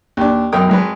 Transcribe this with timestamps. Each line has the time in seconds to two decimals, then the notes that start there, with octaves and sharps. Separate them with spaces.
0.17 D#2 D4
0.52 F#2 B2 A#4 G5 D#6
0.69 G#1 G#3 B4